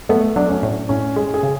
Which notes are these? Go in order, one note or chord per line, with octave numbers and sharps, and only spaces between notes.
A3 B3
F#3 D4
C#4
A2
A2 C#4
G#3 G#4
G#4
C#3